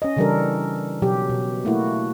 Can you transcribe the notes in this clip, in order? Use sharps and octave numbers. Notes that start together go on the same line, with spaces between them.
C#4 D#5
C#3 E3 G3 D4 A4 A#4
B2 F#3 G4
B2
A3 A#3 E4 F#4